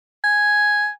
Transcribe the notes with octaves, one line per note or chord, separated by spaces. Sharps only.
G#5